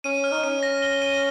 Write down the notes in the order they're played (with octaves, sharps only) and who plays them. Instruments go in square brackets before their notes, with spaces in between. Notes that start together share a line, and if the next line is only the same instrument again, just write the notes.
[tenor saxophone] C#4 [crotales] D#7
[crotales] F6
[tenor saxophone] D#4
[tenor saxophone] C#4 [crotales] D#7
[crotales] A#6
G7
D#7